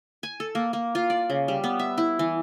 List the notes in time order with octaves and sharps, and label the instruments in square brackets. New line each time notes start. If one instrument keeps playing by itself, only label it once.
[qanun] G#5
A4
A#3
A#3
F4
D5
C#3
G3
B3
E5
E4
E3